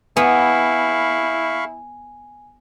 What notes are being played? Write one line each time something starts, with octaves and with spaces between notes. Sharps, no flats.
B3 E4 F5 G#5 B5 C#6